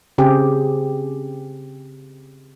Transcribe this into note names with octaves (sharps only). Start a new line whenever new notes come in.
C#3 C4 G4 G#4